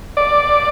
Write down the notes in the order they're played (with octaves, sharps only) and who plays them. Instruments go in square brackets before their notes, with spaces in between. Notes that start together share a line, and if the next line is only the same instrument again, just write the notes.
[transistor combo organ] D5